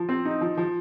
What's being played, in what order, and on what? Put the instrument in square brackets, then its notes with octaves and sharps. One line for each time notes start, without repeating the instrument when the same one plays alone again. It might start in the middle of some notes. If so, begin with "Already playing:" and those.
Already playing: [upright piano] F3
C4
D#4
F3
F3